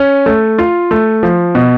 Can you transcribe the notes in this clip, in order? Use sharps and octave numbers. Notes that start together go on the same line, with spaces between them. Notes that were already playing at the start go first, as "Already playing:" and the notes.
Already playing: C#4
A3
F4
A3
F3
B2